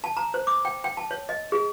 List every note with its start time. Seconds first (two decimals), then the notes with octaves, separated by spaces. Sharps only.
0.04 A5
0.17 A#5
0.34 C5
0.47 D6
0.65 G5
0.84 G5
0.97 A5
1.11 C#5
1.29 D#5
1.52 G#4